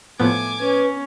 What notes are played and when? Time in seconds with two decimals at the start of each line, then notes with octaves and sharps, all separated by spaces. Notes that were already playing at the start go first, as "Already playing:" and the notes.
0.20 A2 F3 B3 G#5 D6
0.59 C#4 B4